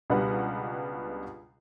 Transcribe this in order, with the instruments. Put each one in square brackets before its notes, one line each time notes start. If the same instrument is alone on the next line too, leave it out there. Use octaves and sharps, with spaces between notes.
[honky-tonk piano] C#2 B2 G3 D4 B4 F#5